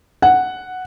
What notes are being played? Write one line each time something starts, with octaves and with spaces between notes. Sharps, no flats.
F#5